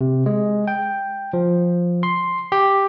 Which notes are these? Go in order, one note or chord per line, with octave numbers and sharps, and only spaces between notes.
C3
G#3
G5
F3
C6
G4